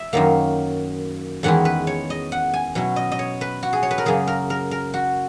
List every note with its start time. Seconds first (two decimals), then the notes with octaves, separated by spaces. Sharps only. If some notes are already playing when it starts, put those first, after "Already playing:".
Already playing: E5
0.13 F#2 D#3 F#3 A#3
1.43 E2 D#3 G#3 C#4 E4 F#5
1.65 B4
1.87 C#5
2.10 D#5
2.32 F#5
2.53 G#5
2.75 B2 F#3 C#4 E4
2.96 D#5
3.12 D#5
3.19 C#5
3.41 B4
3.63 F#4
3.73 G#4
3.83 C#5
3.91 B4
3.98 A#4
4.05 F#2 C#3 F#3 A#3 G#4
4.27 A#4
4.50 A#4
4.71 A#4
4.94 F#4